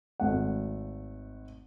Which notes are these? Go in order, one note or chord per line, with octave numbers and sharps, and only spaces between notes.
G#1 A3 F#5